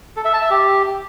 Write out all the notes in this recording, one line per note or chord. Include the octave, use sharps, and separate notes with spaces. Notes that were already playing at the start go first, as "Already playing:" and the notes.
A4
E5
A5
E5
G4